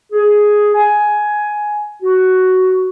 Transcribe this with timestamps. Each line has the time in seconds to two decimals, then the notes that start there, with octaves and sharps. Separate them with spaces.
0.12 G#4
0.75 G#5
2.03 F#4